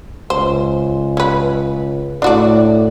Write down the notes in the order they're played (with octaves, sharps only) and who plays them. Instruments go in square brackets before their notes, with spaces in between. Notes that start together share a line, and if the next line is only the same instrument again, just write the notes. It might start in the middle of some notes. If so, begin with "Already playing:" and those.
[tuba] C#2 [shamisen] C5
[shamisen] C#4 B4
[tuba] A2 [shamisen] D4 F#4 D5